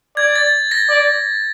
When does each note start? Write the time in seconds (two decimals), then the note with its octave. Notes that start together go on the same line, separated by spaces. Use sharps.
0.17 D5 G#6
0.35 A6
0.72 A#6
0.90 D5